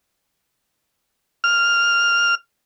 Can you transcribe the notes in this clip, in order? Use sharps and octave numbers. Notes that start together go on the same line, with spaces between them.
F6